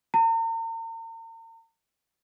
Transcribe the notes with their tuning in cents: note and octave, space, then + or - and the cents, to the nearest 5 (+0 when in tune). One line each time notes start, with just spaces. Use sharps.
A#5 -40